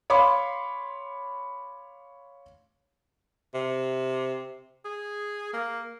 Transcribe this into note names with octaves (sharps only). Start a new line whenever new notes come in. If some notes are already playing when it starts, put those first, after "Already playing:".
C#5 F5 B5 C6 D6
C3
G#4
A#3